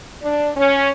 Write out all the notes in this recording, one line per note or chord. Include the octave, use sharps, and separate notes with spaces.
D4
C#4